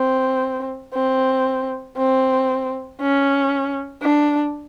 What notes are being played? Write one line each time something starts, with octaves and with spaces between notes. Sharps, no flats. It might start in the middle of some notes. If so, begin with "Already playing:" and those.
Already playing: C4
C4
C4
C#4
D4